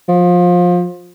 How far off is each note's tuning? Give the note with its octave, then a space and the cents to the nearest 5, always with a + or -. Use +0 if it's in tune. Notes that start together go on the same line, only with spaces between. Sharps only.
F3 +20